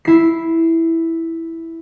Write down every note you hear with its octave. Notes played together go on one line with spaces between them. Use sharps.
E4 C7